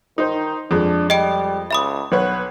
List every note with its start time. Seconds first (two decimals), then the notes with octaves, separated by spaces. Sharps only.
0.18 D#3 D#4 C5
0.71 F2 G#3 D4
1.10 G3 D#5 G5 D7
1.71 C#2 E5 B5 D#6
2.12 B1 B3 B4 C#5